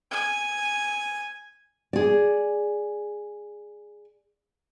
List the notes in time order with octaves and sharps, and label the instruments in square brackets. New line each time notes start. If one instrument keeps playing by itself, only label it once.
[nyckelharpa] G#5
[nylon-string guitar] G#4 D5